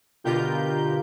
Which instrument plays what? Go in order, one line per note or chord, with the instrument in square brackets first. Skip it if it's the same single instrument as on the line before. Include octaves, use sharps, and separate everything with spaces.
[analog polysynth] B2 D3 F4 G4 A#4 G6